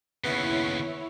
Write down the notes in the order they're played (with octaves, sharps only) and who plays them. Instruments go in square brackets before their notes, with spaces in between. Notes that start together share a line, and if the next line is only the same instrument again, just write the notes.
[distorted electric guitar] D#2 C#3 [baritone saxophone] B3 [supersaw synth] E4 C#5